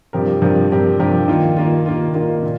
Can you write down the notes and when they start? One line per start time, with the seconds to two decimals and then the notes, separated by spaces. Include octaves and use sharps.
0.13 G2 F3 C4 G4 A#4
0.42 G2 F3 C4 G4 A#4
0.70 G2 F3 C4 G4 A#4
0.99 G2 F3 C4 G4 A#4
1.28 D#3 A#3 F4
1.57 D#3 A#3 F4
1.86 D#3 A#3 F4
2.14 D#3 A#3 F4
2.43 A#2